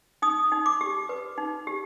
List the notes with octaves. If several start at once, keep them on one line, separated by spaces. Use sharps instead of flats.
D#4 D#6
D#4
D6
G4
B4
D#4
G4